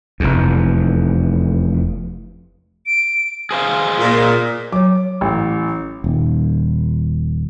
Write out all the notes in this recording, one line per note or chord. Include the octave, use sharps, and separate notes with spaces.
F1 E2
D7
G#4 C5 F5
A#2
F#3 C#5 D6
A1
D#1